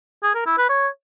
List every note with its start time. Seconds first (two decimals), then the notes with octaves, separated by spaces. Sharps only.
0.23 G#4
0.35 A#4
0.46 E4
0.58 B4
0.70 C#5